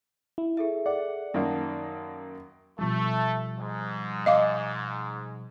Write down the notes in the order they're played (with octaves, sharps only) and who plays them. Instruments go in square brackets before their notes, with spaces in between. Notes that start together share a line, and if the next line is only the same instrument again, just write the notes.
[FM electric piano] E4
[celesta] G#4 A4 E5
[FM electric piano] D5 [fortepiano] F#5
[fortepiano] F#2 D#3 A#3 [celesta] F#5 A5
[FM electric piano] B2 F3 G3 [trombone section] A3
[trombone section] G#2
[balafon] D#5 F5 D6